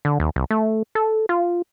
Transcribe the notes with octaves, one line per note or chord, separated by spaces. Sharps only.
D3
D#2
C2
A3
A4
F4